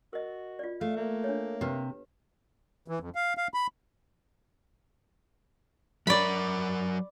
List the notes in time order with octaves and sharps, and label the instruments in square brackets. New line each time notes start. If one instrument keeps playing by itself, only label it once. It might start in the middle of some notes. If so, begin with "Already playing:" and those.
[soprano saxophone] F#4 [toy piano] A#4 D#5
[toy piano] F4 D5
[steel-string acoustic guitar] A3 [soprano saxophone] F5
[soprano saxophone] A#3
[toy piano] D4 C#5
[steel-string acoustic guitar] C3 [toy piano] G4 B4
[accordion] E3
F2
F5
F5
B5
[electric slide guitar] F#3 A#4 [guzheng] D5 B5